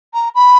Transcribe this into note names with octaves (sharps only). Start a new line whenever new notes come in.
A#5
B5